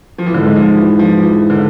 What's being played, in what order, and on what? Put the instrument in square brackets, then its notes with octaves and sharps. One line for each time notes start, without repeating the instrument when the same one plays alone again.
[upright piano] F3
E3
[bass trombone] G#2 [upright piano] D3
[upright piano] G#3
F3
E3
F3
E3
D3